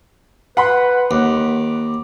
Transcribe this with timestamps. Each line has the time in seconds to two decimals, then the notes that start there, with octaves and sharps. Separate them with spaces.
0.57 B4 F#5 B5 C6
1.11 D#2 D6